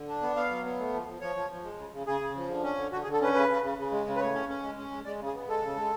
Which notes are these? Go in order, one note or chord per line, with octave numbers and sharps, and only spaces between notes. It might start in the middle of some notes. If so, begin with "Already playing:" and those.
Already playing: D3
D4
B3
B3 F5
F#3
B3
A3
F3
F3
F3 C#5
F3
F3
G#3
C#3
C#3
C#3 G#4
C#3
F3
D3
C#4
D3
D3 F#4
G#4
D3
A4
C#4 B4
C#3 B4
C#3
C#3
C#3
G#3
C#3
B4
A2 C#5
C#4
C#4
G#3
C#4
G#3
G#3 D5
C#3
G#4
B3
G#3 A4
C#3
G#3